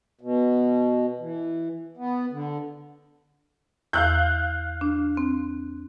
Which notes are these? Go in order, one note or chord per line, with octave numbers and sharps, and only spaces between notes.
B2
E3
B3
D3
E2 F5 E6 F#6 G6
D4
C4